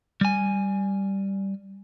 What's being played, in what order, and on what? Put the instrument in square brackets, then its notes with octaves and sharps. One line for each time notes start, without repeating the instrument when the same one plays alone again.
[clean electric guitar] G3 G#5